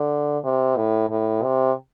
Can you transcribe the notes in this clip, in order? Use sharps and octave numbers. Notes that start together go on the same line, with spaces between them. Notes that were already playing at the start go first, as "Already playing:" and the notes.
Already playing: D3
C3
A2
A2
C3